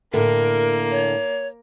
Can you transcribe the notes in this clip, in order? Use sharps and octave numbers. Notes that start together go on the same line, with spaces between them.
A2 D3 A#3 A#4
C#5